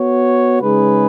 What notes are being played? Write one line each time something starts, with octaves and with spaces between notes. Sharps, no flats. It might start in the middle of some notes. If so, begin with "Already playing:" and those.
Already playing: B3 F#4 C#5
C#3 G#3 D#4 G#4 B4